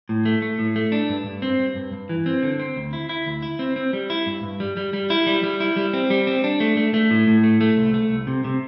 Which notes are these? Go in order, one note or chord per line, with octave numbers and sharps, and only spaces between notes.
A2
A3
A3
A2
A3
D4
G2
G2
C4
G2
G2
G2
E3
C4
D3
C4
D2
E4
E4
D2
E4
C4
C4
G3
E4
G2
G2
G3
G3
G3
E4
G3
G3
E4
G3
C4
G3
C4
D4
A3
A3
A3
A2
A2
A3
A3
C2
A3
C2
C3
C3